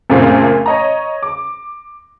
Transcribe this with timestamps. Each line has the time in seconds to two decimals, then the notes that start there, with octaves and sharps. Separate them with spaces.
0.10 F#2 A#2 C#3 A3 A#3 C4
0.66 C#5 D#5 A#5
1.23 D6